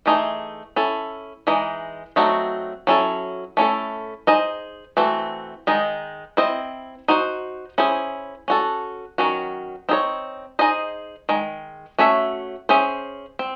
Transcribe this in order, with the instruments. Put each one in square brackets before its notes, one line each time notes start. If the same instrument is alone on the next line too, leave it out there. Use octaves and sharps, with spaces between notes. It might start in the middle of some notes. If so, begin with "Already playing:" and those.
[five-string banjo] E3 A3 D#4 G#4
C#4 E4 A4
E3 G#3 D#4
F#3 A3 C4 D#4 F#4
F#3 C#4 E4 A4
A3 C#4 E4 A4
D#4 G#4 C5 D#5
E3 A3 C4 F#4
D#3 G#3 D#4
C4 E4 C5 D#5
D#4 F#4 C5
C#4 E4 G#4 C5
C#4 F#4 A4
D#3 F#3 C#4 F#4
C4 D#4 G#4 C#5
D#4 G#4 C5 D#5
D#3 G#3
A3 C#4 F#4 C#5 E5
C#4 G#4 C5 E5
C4